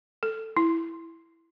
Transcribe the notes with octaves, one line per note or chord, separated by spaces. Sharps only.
A4
E4